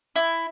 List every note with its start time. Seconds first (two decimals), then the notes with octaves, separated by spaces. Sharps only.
0.16 E4